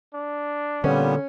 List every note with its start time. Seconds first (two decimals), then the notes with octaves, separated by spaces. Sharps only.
0.14 D4
0.84 A#2 D3 G3 B3 C#4